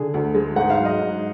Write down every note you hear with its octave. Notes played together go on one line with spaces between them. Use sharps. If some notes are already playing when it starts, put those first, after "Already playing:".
Already playing: D3 G#4
D2
G#3
G#2 F#5
F5
F#3
D#5
G#2